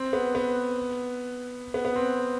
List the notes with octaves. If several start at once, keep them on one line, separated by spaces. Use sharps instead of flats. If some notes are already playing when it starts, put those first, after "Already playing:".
Already playing: C4
B3
B3
B3
B3
C4